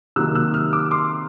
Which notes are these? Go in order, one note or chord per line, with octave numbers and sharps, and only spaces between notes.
C3 D#3 F#3 A#3 E6 F#6
E6 F#6
D#6 F6
D6 E6
C6 D6